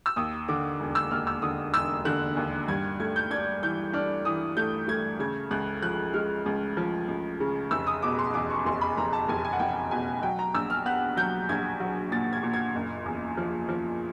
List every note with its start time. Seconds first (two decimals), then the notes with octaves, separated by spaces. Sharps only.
0.06 E6
0.16 D#2 D#6
0.48 D3 D6
0.80 E1
0.95 E6
1.11 D#2 F6
1.27 E6
1.42 D3 D#6
1.74 E1 E6
2.05 D3 F#6
2.37 D#2
2.68 G2 G#6
3.00 A3 G#6
3.16 G6
3.31 D4 G#6
3.62 E3 G6
3.93 D4 F6
4.25 E3 D#6
4.57 A3 G6
4.88 A3 G#6
5.19 C#3 G#6
5.51 C#2 F#6
5.82 F3 F#6
6.14 G#3 F6
6.46 C#2
6.77 F3
7.08 C#2
7.40 C#3
7.71 F1 E6
7.87 D#6
8.02 B2 D6
8.19 C6
8.34 E2 D6
8.50 C#6
8.65 F1 C6
8.81 B5
8.97 F1 A#5
9.13 A5
9.28 F1 G#5
9.45 G#5
9.53 F#5
9.59 F1 G5
9.91 B2 G#5
10.23 F#3 G5
10.39 A#5
10.54 A#1 E6
10.70 F6
10.86 B3 F#6
11.17 F#3 G6
11.49 A#1 G#6
11.80 F#3
12.11 A#2 A6
12.33 G#6
12.43 A#2
12.54 G#6
12.75 F#1
13.06 E2
13.37 F3
13.69 F3